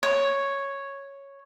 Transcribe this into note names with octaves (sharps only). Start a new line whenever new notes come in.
C#5